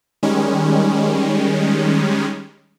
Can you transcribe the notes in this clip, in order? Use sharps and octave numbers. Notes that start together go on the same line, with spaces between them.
D#3 G3 G#3 C#4